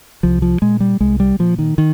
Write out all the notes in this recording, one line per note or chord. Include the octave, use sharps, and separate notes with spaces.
C2 F3
F3
A#2 G#3
G3
C2 G#3
G3
A#2 F3
D#3
D#3